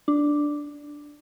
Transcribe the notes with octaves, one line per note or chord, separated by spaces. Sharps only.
D4